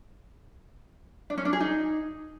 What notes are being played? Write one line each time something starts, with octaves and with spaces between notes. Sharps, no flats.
D4
C#4
D4
G#4
D#4